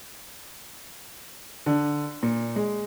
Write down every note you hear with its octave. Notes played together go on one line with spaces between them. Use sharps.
D3
A#2
G#3